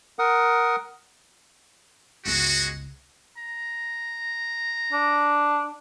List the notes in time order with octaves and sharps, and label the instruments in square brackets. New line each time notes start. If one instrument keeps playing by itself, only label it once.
[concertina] A#4 F#5 D#6
[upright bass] G1 C#2 [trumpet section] G#3 F#4
[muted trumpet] A#5
[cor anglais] D4